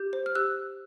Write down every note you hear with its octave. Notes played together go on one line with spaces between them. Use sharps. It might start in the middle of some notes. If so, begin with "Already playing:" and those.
Already playing: G4 G6
C5
F6
G4 E6 F#6